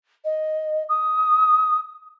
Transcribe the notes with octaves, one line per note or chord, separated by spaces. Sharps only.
D#5
D#6